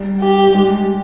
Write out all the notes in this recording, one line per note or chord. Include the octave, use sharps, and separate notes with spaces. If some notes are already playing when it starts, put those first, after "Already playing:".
Already playing: G3
G4
G3
G#3